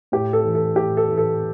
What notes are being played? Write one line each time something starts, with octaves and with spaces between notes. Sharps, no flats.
A2 G4
A4
E3
A4
A2 G4
A4
E3
A4